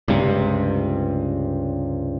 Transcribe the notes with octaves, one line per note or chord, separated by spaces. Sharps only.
C#2 G2 C3